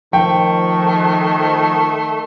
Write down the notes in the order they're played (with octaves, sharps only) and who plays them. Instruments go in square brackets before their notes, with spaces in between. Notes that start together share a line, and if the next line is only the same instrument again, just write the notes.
[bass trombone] D#3 [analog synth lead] F3 [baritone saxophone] A3 [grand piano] G5